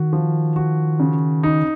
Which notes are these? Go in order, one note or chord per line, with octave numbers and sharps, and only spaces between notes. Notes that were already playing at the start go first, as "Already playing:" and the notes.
Already playing: D#3 F#4
F3
F#4
C#3
D#4